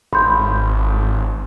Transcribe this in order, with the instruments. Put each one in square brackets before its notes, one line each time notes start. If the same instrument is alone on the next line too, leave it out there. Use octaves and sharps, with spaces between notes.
[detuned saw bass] G#1 [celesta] B5 C6 G6